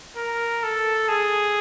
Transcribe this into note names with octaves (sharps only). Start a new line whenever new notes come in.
A#4
A4
G#4